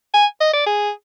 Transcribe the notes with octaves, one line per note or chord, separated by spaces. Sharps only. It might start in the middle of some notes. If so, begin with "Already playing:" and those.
G#5
D#5
D5
G#4